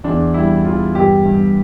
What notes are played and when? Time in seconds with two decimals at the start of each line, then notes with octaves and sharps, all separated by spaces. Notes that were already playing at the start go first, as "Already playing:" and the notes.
0.04 E2 D4
0.34 G3 E4
0.65 E2 F4
0.95 G2 G4
1.25 G2